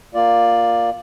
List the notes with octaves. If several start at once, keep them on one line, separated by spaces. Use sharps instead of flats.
A#3 F4 D5